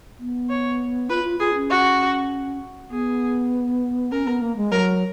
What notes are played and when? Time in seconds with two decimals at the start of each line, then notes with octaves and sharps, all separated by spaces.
0.19 B3
0.49 C#5
1.10 F4 B4
1.24 F4
1.40 F4 G#4
1.55 C#4
1.70 F#4
2.90 B3 G#4
4.12 C#4 A#4
4.26 B3
4.41 A#3
4.57 G#3
4.72 F#3 A#4